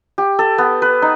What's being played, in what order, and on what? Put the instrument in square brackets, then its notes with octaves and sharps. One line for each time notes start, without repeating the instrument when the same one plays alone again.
[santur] G4
A4
B3
B4
D#4